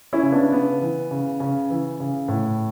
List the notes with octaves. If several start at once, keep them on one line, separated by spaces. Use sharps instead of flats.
C#4 E4
C#3
B3 D4
C#3 B3
E3
C#3
C#3
E3
C#3
A2